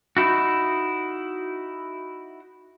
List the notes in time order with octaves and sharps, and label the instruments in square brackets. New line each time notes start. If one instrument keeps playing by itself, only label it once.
[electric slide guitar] D#4 E4 F#4